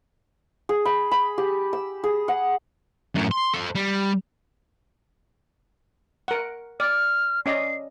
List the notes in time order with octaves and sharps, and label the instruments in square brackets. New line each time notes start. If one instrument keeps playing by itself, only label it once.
[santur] G#4
B5
B5
G4
E6
G#4
F#5
[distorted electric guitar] F#2 A2
C6
A4 C5
G3
[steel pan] A#4 F#5
[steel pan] D5 [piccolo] F6
[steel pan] C#4 D5 D#5 [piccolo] C7